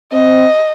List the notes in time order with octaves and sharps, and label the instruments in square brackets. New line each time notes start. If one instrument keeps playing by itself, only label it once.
[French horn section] C4 [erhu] D#5